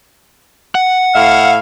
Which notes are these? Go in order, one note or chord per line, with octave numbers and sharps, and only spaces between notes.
F#5
A2 E5 F5